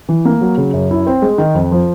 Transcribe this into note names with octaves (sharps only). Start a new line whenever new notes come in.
E3
A#3
F#3
C#3
F#2
E4
C4
G#3
D#3
F2
F3